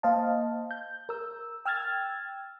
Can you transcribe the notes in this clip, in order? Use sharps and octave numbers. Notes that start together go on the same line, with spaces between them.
A#3 C5 D#5 F5 A5
G6
A#4 E6
G5 E6 F6 G#6 A6